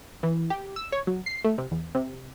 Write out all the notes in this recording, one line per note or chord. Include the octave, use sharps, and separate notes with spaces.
E3
G4
E6
C#5
F#3
C7
A3
C3
E2
C3